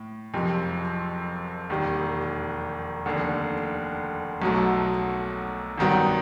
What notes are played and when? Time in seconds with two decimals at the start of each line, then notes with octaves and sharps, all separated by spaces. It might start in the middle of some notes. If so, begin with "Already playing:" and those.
Already playing: A2
0.33 F#1 F2 C3
1.70 E1 D#2 D#3 G3
3.06 F1 D#2 D3
4.42 B1 B2 F#3 A3
5.77 A1 G2 D#3 F#3 B3